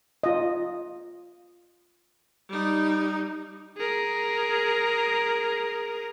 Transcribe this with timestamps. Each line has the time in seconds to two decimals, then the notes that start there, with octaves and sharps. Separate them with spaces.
0.23 F4 D#5
2.50 G3 D#4
3.77 G#4 A#4